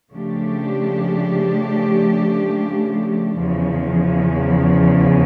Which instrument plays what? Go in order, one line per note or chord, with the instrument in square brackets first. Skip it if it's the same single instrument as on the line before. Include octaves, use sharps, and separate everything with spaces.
[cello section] C#3 F3 A3 D4 G4
E2 C#3 F3